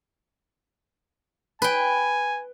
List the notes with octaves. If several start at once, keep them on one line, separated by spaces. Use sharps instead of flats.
B4 G5 G#5